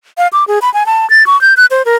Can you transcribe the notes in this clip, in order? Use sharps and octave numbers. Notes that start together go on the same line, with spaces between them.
F5
D6
G#4
B5
G#5
A5
A6
C#6
G6
F#6
C5
A#4